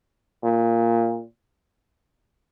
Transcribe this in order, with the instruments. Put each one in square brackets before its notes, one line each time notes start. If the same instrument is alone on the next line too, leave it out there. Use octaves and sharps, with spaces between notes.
[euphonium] A#2